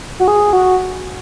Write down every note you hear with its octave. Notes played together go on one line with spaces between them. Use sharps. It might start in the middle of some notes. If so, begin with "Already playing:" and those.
F#4
G#4
F#4